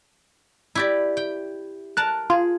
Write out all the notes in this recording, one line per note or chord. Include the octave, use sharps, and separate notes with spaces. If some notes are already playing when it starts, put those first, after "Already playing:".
E4 G4 D5
G5
A#4 A5 F#6
F4 G#4